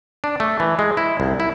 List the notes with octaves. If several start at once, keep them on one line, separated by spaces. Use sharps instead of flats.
D4
A3
E3
G#3
E4
C2
E4